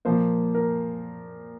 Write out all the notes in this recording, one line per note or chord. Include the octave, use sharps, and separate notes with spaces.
A#2 F3 A#3 C5
A#4